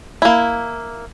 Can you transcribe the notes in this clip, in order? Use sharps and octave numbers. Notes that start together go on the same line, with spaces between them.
A#3 E4